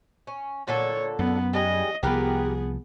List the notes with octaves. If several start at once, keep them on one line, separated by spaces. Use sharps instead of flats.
C#4
A#2 D3 A4 C#5
F#2 B3
G3 G#3 G#4 D#5
C2 F3 B3 G4 G#4 A#4 B4